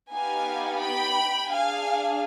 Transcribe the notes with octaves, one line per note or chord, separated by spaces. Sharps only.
B3 D#4 G4 F5 G#5
G5 B5
D4 G#4 F5 G#5